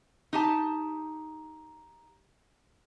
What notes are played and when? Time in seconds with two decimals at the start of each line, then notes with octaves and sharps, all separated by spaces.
0.33 D#4 G4 A5